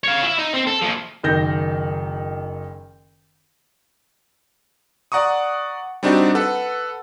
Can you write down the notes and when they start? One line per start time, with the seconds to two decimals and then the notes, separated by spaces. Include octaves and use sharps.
0.04 C#5 F5
0.23 E4 E5
0.39 D#4
0.54 C4
0.67 A4
0.82 A#2 F3
1.23 F#1 D#3 G6 A#6
5.12 D5 F#5 A#5 C#6 D#6
6.03 G3 C4 D4 D#4 F#4 G4
6.35 A4 B4 F#5